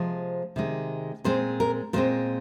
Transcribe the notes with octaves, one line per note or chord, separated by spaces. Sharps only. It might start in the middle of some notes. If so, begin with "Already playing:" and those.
Already playing: C3 F3 G#3 C5
C3 D#3 G#3
A#2 G#3 C4 C5
A#4
A#2 G#3 C4 C5